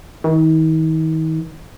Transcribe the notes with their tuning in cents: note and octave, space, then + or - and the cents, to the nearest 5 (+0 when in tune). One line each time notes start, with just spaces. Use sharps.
D#3 +40